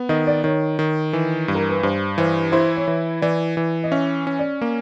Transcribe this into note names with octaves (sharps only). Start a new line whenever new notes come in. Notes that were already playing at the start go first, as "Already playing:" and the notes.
Already playing: B3
D#3 D#5
D5
D#3 C#5
D#3
E3
G2
A#4
B4
G2 C5
E3 C5
E4 C5
C#5
E3
E3 D5
E3
D#5
C#4 E5
C#4
D5
A#3